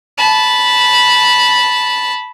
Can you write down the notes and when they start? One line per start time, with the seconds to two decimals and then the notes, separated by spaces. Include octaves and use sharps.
0.18 A5 B5